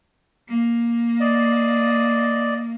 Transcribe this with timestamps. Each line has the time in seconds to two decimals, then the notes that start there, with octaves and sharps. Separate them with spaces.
0.49 A#3
1.20 D5 D#5